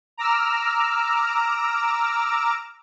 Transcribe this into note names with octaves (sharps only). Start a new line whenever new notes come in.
A#5 D6 E6 F6